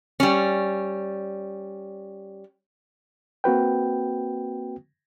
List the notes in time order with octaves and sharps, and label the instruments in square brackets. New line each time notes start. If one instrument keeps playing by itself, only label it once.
[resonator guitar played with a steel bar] G3 C#4
[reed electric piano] A#3 C4 F#4 B4 G5